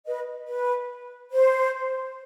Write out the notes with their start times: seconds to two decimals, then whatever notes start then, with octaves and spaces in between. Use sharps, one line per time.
0.06 B4 D#5
0.47 B4
1.31 C5